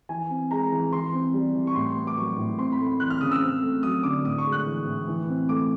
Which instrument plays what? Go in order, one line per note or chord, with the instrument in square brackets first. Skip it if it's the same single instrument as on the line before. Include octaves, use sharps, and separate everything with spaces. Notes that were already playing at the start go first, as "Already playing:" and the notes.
[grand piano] E3 G#5
C4
G#3 A#5
E3
E3 C6
C4
G3
E3
C#6
A2 C6
B3
D6
F#3 C#6
A2
C4 C6
B5
A3
C6
E3 F#6
F6
C#3 D#6
E6
C4
A3
F#3 D#6
D3 D6
A2 D#6
C#6
G#3
F#6
E3
A2
E3
C4
A3 D6